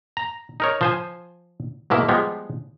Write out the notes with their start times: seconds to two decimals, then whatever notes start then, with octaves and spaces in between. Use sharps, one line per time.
0.17 A#5
0.60 D#4 A#4 C#5
0.81 F3 C5 G#5
1.90 G#2 B2 A#3 E4
2.08 F3 G3 G#3 B3